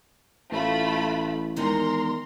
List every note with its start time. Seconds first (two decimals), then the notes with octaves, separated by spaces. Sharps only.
0.52 A1 A3 F4 B5
1.56 E2 D#3 G#3 A#4 A#5 C6